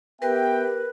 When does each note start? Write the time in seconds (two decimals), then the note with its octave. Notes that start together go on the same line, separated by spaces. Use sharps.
0.22 B3 G4 A#4 B4 E5 G5